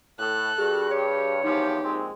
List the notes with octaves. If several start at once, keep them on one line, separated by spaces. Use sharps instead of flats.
A2 A4 F#6
G2 F#4 G#4
G4 C#5
G#1 E2 F3 D#4 G4
A#1 G#3 C4